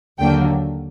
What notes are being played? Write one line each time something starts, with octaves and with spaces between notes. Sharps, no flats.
D#2 D3 F#3 A#3 D4 G5